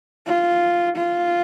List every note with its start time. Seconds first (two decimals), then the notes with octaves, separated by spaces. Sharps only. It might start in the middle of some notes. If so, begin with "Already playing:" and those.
0.27 F4
0.96 F4